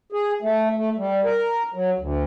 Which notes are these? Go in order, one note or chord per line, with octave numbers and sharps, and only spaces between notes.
G#4
A3
A3
G3
A#4
F#3
D2